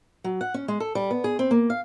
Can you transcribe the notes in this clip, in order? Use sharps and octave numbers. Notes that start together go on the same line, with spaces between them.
F#3
F#5
C#4
G#3
A4
G3
B3
G#4
C4
A#3
F5